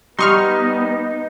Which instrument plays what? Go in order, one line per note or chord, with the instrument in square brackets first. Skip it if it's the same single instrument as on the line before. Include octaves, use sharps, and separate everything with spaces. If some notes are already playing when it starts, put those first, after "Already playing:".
[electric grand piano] G3 D#6 [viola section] B3 [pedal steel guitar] D#4 [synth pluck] C6 C#6 F6